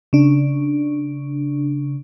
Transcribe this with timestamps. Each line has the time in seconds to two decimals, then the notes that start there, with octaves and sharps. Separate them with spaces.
0.13 C#3 D4